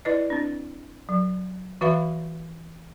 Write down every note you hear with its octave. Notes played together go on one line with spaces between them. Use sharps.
E4 B4 D5 D#5
C4 D4
F#3
E3 F#4 B4 E5 F5 B5